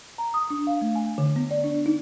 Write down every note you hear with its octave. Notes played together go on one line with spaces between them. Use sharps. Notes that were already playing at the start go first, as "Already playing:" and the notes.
A#5
D#6
D4
F5
A3
G#5
D3
B3
D5
D4
D#4